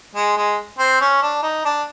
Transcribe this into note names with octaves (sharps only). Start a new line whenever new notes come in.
G#3
G#3
C4
C#4
D4
D#4
D4